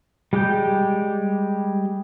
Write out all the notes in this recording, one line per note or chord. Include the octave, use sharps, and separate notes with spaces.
G3 G#3 G4 G5 G6